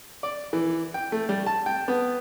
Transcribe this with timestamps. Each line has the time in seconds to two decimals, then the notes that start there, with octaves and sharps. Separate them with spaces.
0.23 D5
0.53 E3
0.94 G5
1.12 A3
1.29 G3
1.46 A5
1.66 G5
1.88 B3